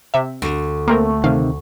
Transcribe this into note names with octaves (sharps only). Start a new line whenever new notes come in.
C3 E5
D2
A3 A#3 C4 A#4
C3 D#3 F5